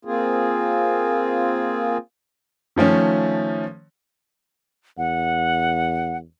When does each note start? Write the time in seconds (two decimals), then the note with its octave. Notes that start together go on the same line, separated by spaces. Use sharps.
0.05 A#3 C4 F4 G#4
2.76 D#3 F3 A3 C#4
4.98 E2 F#5